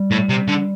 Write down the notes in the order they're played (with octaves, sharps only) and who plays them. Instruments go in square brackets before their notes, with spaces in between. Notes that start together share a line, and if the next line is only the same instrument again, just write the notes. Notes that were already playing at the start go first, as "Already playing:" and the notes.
Already playing: [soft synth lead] G3
[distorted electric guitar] A2
C3
D3